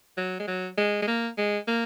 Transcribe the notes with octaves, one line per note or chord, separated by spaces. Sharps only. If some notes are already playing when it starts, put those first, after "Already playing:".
F#3
G#3
F#3
G#3
G#3
A#3
G#3
A#3